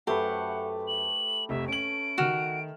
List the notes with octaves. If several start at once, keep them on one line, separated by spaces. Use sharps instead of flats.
F#2 A3 G4 B4 C5 F#5
F#7
F1 F2 C3 E5
C#4 D7 F#7
D#3 F#4 F6 E7